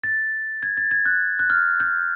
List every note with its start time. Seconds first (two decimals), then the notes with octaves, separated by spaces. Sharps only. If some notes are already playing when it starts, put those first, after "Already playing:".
0.04 A6
0.63 G#6
0.77 A6
0.91 G#6
1.06 F#6
1.39 F#6
1.50 F6
1.80 G6